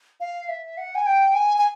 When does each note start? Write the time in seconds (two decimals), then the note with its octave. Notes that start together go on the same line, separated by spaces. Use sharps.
0.20 F5
0.49 E5
0.77 F#5
0.95 G#5
1.06 G5
1.34 G#5
1.58 G#5